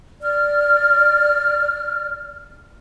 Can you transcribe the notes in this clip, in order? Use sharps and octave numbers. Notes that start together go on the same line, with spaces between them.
D5 F6